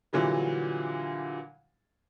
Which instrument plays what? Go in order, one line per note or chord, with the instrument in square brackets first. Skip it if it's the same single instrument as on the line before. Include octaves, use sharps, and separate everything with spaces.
[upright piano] A#2 D3 E3 F#3 G3